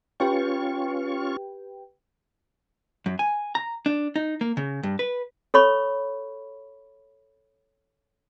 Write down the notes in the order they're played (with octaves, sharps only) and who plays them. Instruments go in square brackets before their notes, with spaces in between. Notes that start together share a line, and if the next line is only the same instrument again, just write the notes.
[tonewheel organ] C#4 F4 C#6 [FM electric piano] G4 B4 G5
[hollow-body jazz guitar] F#2
G#5
A#5
D4
D#4
A#3
C#3
G2
B4
[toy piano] A4 C#5 B5 C#6